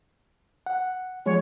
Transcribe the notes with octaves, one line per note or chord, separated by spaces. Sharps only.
F#5
F3 G#3 C#5